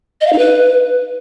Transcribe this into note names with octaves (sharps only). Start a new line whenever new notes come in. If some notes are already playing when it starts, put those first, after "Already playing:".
D#5
F5
D#4
B4